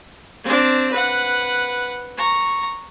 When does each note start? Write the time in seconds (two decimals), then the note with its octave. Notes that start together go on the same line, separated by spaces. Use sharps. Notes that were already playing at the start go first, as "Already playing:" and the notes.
0.43 C4 D4
0.92 B4 F#5
2.17 A#5 C#6